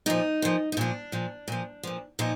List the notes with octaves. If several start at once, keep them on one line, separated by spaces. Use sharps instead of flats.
A#2 F3 D#4
A#2 F3
D#4
A#2 F3 D4
A#2 F3
A#2 F3
A#2 F3
A#2 F3 D#4